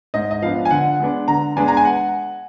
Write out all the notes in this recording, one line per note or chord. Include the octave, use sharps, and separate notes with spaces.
G#2 D#5
D#5
F3 B3 D4 F5
G#5
D3 F#5
G#3 B3 D4
D3 A#5
G#3 B3 D4 G#5
A#5
G#5
F#5